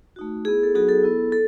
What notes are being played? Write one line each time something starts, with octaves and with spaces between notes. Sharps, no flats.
A3 D#4 F#4
B3 E4 G#4
A4
F#3 B3 D#4 F#4 G#4
A4
B3 E4
A4